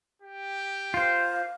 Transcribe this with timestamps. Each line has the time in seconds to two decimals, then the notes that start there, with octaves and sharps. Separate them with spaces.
0.22 G4
0.94 F4 C5 F5